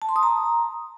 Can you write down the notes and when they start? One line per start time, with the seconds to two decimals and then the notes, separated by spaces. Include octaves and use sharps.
0.02 A5
0.09 C6
0.16 D#6
0.23 A#5